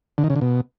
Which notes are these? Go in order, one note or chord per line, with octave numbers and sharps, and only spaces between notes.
D3
D#3
C#3
D3
B2